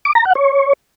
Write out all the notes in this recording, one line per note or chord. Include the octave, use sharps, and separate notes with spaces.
D6
A#5
F#5
C#5